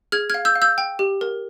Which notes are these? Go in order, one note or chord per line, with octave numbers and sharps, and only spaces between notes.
G#4 F6 G#6
F5 F6 G#6
E6 G6
F5
E6 G6
G5
G4
A#4